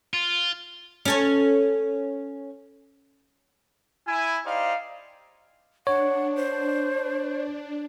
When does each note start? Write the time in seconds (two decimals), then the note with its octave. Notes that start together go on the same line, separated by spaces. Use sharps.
0.14 F4
1.05 C#4 A4 C#5
4.08 E4 G#5
4.46 D#4 G4 C5 D5 F5
5.87 D4 C#5 F#5
6.36 C5